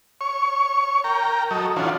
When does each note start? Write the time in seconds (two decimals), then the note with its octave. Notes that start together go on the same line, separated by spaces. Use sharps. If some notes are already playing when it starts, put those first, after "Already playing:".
0.21 C#5 C#6
1.04 A#4 G5 A#5
1.51 F#3 A4 D#5
1.76 E3 C#4 D4 F4 F#4